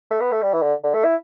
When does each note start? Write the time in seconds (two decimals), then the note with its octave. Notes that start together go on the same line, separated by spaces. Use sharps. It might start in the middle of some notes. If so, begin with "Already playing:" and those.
0.11 A3
0.20 B3
0.32 A3
0.42 G3
0.53 E3
0.62 D3
0.84 D3
0.94 A3
1.04 E4